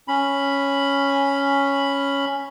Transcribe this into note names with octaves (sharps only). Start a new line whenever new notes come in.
C#4 B5